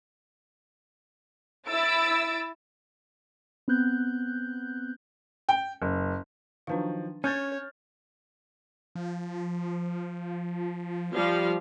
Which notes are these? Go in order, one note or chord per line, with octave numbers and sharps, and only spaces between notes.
E4 E6 A6 D7
B3 C4 F#6 G6
G5
F#1
D#3 F3 F#3 D4 B4 F5
C#4 C#5 F6 G6 A6
F3
F3 G3 F5